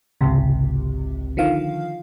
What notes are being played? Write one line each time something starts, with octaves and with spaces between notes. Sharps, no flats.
G#1 C#2 C3
D3 D#3 F3 F5